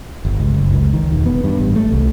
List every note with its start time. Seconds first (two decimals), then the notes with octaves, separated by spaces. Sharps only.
0.25 G1
0.39 C#2
0.54 F#1
0.73 C#2
0.93 D#3
1.12 E1
1.26 B3
1.44 G2
1.60 A1
1.76 A3
1.92 C2